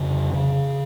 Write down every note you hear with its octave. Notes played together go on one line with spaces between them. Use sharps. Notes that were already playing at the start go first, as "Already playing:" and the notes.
Already playing: F2 C#3
C#3